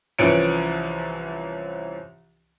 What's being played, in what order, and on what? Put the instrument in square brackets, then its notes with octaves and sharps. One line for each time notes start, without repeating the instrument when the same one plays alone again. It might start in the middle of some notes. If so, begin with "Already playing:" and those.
[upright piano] C2 E3 F3 C#4 C#7 D7